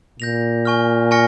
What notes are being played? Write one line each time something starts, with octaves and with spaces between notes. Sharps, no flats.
A#2 G6 A#6 F7
G#5 C#6 F6
G#5 C#6 F6 A#6 C#7